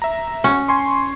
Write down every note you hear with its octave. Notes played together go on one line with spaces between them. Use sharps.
E5 A#5
C#4 F#4
G#5 C6 C#6